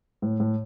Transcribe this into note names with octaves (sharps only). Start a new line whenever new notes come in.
A2
A2